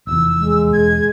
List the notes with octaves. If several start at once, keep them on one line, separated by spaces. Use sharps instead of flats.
F1 E2 E6
G#3
E1 G#6